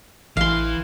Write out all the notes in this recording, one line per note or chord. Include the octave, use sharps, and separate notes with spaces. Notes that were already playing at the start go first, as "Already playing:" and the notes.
A1 E3 F5 C6